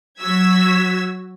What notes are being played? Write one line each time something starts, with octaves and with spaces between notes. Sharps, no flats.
F#3 F#4 E6 G#6 B6